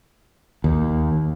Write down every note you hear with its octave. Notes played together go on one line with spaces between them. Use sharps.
D#2